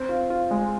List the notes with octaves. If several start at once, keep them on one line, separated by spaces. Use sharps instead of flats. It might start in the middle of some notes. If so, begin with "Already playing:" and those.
Already playing: C4
F4
F4
G#3